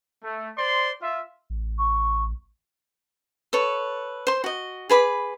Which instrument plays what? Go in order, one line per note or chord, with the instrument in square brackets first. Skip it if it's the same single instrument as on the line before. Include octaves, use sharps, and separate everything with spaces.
[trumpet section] A3
C5 D5 C6
F4 E5
[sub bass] A1
[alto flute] C#6
[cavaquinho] A4 B4 C#5
C5 C6
F#4 D#5
G#4 B4 B5 D6